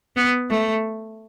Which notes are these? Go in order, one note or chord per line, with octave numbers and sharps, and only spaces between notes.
B3
A3